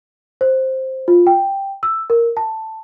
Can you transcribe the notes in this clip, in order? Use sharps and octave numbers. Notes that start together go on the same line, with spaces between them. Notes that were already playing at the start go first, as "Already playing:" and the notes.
C5
F4
G5
E6
A#4
A5